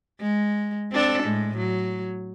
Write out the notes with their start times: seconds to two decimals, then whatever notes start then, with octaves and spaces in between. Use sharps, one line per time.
0.21 G#3
0.92 C4 D4 A4
1.23 A2 G#3
1.58 F#3